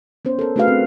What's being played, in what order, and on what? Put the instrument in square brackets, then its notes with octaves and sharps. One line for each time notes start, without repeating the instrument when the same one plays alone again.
[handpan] B3 C#4 C5
A4 A#4
A3 D4 F#4 G#4 B4 F5
C4